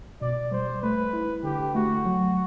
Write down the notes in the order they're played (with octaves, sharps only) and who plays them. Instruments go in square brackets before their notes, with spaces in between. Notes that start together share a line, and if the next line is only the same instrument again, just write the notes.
[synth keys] B2 [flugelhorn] D5
[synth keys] G3 [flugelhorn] C5
[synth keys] A3 [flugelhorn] B4
[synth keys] E4
[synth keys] D3 [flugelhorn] G4
[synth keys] A3 [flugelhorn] F#4
[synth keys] F#3